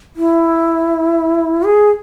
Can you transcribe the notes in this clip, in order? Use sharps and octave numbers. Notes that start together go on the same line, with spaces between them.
E4
G#4